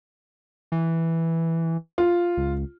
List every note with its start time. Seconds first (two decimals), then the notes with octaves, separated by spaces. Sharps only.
0.72 E3
1.98 F4
2.37 C#2